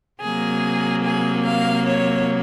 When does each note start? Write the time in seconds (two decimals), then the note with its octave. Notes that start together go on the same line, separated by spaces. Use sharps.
0.21 C3 F#3 A#3 G#4
1.04 G#4
1.46 F5
1.87 C#5